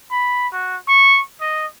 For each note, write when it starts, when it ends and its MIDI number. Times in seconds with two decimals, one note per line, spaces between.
0.11 0.48 83
0.53 0.76 66
0.88 1.20 85
1.41 1.66 75